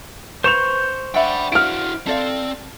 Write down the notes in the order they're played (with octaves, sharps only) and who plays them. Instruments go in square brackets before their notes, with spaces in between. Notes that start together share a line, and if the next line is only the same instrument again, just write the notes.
[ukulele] B4 [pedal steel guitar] C5 C#6 G6 [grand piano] E7 F7
[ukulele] D4 E5 F#5 [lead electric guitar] G5 B5
[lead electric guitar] E4 F#4 [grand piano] F6 D7
[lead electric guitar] C4 [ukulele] A4 D5 F5